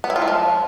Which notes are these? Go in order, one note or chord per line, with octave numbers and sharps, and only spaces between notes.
B3
E4
F4
G#3
F3